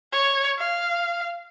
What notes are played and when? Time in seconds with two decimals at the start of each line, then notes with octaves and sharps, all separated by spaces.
0.12 C#5
0.58 F5